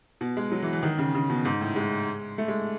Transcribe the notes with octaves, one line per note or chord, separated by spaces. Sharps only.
B2
G#3
F#3
E3
E3
D#3
C#3
C#3
B2
G#2
A2
G#3
A3
G#3